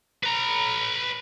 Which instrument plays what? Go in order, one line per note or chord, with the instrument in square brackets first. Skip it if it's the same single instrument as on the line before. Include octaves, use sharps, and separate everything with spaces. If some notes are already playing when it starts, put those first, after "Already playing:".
[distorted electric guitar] B4 A#5